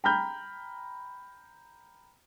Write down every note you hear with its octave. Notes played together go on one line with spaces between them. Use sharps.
G5 A#5 B5 F6 G6